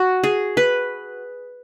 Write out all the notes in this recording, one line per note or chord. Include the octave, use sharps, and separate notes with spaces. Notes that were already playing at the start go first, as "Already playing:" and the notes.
Already playing: F#4
G#4
B4